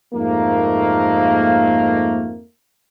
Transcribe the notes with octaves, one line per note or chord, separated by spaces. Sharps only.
F2 G#2 A3 A#3